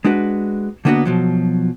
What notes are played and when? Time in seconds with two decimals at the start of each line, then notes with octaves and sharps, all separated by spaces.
0.05 G#3 D4 F#4 B4
0.85 D3 A#3 B3 D4 F#4 D#5
1.05 B2 F3 F#3